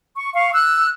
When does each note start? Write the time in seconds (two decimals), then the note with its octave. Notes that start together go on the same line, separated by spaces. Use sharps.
0.16 C#6
0.34 F5 C#6
0.54 E6 F#6